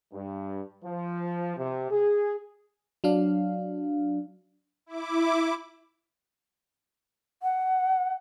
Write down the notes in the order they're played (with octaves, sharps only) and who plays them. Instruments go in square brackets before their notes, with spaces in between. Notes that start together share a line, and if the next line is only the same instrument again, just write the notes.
[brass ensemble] G2
F3
C3
G#4
[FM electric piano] F#3 D4 F5
[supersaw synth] E4 D6
[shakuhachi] F#5